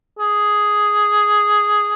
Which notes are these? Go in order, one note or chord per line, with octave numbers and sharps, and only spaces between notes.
G#4